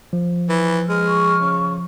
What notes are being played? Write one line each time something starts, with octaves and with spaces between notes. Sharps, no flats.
F3
E3
G#3 F6
C#6
C#3